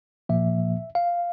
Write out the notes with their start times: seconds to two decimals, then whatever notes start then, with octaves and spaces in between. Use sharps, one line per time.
0.29 A#2 F3 A#3 E5
0.95 F5